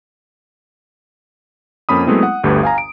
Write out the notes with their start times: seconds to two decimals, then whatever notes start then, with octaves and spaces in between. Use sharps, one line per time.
1.89 F2 A#3 C#4 B5 D#6
2.07 F#3 G#3 A3 B3 C4 E4
2.23 F#5
2.44 G1 D2 A3 G4 B4
2.63 F5 G#5 A#5
2.78 D7